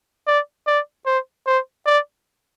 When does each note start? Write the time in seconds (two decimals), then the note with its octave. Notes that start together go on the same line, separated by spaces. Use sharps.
0.27 D5
0.67 D5
1.06 C5
1.47 C5
1.86 D5